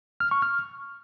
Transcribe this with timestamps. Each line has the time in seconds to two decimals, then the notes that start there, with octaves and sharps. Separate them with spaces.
0.20 F6
0.31 C#6
0.42 F6